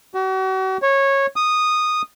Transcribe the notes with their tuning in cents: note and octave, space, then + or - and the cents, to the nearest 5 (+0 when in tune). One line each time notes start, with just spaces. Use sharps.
F#4 +40
C#5 -15
D#6 -10